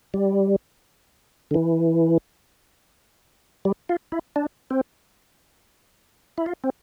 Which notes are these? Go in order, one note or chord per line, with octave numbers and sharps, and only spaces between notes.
G3
D3
E3
G3
F4
E4
D4
C4
E4
F4
C4